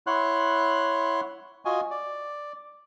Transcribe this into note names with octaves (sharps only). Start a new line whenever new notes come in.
E4 C#5 F#5 C6 F#6
F4 F#4 D#5 G#5
D5